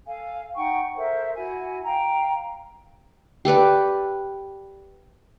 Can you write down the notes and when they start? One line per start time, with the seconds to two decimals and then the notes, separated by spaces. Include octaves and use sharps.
0.07 A4 F5 G#5
0.55 D#4 F#5 G5 C#6
0.95 A4 A#4 C5 E5
1.35 E4 F#4 G#5
1.85 F5 G5 A#5
3.45 G4 A4 B4 D5